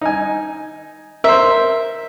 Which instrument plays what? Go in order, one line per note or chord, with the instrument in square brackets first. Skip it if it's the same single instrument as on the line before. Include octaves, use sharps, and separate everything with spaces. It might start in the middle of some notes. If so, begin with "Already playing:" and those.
[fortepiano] D#4 G#5
[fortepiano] A#4 C5 [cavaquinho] E5